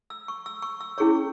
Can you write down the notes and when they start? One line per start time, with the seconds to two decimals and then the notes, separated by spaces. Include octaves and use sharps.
0.10 E6
0.28 C#6
0.46 E6
0.62 C#6
0.81 E6
0.98 C#4 E4 G#4 C#5 C#6